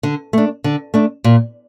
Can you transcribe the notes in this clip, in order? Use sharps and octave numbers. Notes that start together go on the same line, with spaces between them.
D3
A3 D4
D3
A3 D4
A#2